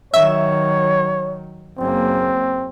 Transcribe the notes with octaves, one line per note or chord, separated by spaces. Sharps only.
D#3 F#3 C#5 E5
F#1 A#3 C4